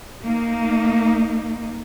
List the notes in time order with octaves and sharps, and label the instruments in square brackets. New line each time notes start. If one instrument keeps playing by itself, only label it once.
[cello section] A#3 D#4